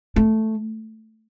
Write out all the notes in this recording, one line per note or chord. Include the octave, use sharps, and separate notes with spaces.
A3